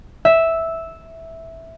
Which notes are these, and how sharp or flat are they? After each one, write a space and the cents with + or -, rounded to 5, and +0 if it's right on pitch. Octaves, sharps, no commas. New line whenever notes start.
E5 -5